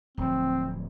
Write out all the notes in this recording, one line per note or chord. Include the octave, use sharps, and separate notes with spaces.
D1 F3 C4